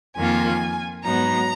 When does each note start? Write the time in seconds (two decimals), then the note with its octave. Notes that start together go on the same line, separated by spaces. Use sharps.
0.16 F2 D#3 A#3 F4 G#5
1.04 G#2 F#3 B3 D#4 A#5